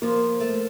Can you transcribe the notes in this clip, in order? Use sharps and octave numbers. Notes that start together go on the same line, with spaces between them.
F3 A#3
A3